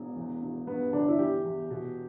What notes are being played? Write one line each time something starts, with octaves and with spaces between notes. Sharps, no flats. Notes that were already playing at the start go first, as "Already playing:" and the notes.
Already playing: E1
E2
E1
G2 B3
G1 D4
E4
E3 G4
E2
B2